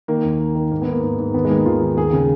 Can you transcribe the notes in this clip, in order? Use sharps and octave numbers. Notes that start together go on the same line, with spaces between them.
D#3 A#3
D#2
D#3
D#3
G#2 A#3
B3
G#2 A#3
G#2
G#2
D#2 B3
G#3
D#3 A#3
D#2 F4
D#3
D#2 G#4
C#3